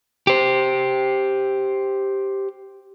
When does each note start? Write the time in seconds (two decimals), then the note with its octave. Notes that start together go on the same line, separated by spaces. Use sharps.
0.27 G4 C5